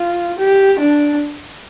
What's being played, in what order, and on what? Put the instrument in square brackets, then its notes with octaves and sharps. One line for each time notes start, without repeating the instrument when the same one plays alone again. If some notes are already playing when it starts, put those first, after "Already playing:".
Already playing: [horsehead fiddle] F4
G4
D4